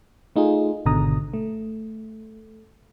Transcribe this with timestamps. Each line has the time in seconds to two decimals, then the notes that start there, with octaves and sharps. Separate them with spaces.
0.36 A3 D#4 F4 G#4
0.86 G#1 B2 D3 A#5 D#6
1.34 A3